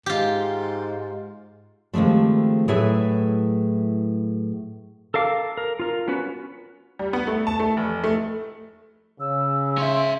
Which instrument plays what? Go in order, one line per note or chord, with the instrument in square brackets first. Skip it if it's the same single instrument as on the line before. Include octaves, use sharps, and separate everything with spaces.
[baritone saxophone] G#2 [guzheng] F4 G4
[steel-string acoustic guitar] C3 D#3 F3 G#3 A3
A2 F#3 E4 G#4 B4 E5
[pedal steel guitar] A4 A#4 F5 D6
A#4
F4 A#4
B3 C#4 F#4 B4
[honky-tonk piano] G3
B3
A3
A5
A3
F1
A3
[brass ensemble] C#3 [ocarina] E6
[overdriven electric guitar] C#4 E5 [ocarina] C6